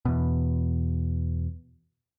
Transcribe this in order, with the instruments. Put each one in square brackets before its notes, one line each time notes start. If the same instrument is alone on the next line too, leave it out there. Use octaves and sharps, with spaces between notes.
[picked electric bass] E2 B2